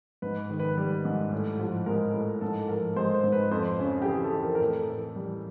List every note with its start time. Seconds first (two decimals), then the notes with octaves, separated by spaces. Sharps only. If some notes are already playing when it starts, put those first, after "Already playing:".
0.22 G#2 B4
0.50 D#3
0.59 B4
0.78 G3
1.05 G#2
1.33 A2
1.59 F3
1.86 G#3 A#4
2.14 A2
2.41 G#2 A4
2.68 F3 A#4
2.96 G#3 C5
3.14 C5
3.24 G#2
3.32 B4
3.51 F2 C5
3.79 C#3
4.02 G4
4.05 E3 G#4
4.24 A4
4.33 F2
4.42 A#4
4.55 A#4
4.60 A2 A4
4.88 E3
5.16 G3